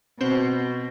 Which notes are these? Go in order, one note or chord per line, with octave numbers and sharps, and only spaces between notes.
B2 C4 C5